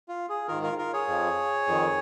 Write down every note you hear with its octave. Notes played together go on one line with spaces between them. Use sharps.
F4
G#4
G#2 D#3 F4 A#4
F4 A#4
F4 A#4
G#4 C#5
F2 F3
F2 D#3